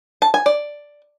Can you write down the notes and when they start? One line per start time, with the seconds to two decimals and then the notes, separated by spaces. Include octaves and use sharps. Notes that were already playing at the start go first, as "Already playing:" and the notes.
0.22 A5
0.34 G#5
0.46 D5